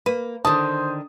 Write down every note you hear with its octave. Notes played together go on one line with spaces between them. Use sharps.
A#3 B4
D3 D#3 C5 A5 D#6